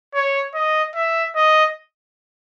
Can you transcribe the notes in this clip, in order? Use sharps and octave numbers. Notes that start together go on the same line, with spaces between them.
C#5
D#5
E5
D#5